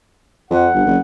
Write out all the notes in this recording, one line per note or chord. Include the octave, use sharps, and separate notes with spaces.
F2 F#5
G1
F#1